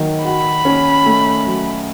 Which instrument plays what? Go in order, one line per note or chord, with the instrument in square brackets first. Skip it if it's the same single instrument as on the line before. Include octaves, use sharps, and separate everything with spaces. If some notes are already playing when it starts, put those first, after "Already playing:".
Already playing: [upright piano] D#3 F#3
[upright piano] F#4 [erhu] B5
[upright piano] C#4
A3
F#3